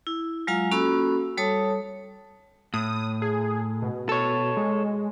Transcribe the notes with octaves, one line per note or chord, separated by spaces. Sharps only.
E4
F#3 G#3 F4 F5 G#5 A#5
A#3 C#4 F#4 A4 B5 E6
G3 A4 C#5 A5 D#6
A2 D#6
G#4
B2
A4 C#5
G#3